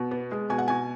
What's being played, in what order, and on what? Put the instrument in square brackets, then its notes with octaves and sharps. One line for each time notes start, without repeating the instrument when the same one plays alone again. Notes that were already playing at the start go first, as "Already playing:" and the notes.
Already playing: [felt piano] B2
B3
G#3
B2 G#5
F#5
B2 G#5